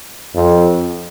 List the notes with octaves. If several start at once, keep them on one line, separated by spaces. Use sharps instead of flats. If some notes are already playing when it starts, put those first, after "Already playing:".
F2